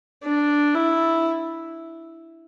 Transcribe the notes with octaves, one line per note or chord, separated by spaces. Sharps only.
D4
E4